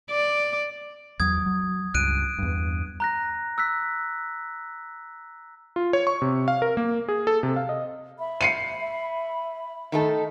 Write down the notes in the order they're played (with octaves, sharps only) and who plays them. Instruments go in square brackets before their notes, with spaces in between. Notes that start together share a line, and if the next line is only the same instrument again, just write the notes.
[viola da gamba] D5
[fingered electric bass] E2 F#3 [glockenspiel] D#6 G#6
[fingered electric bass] F#3
[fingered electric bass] C#2 G2 [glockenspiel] F#6 D7 D#7
[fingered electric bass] E2 G2
[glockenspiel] A#5 F#6 A#6
E6 F#6 B6
[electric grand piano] F4
C#5
C#6
C3
F5
A#4
A#3
G#4
A4
C3
F5
D#5
[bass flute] E5 [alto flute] B5
[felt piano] C7 C#7 D#7
[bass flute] E5
[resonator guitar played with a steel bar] D#3 A3 A4 [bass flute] D#5